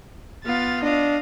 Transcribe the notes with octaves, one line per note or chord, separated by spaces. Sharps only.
B3 F4 F5 A6
D4 D#5 F5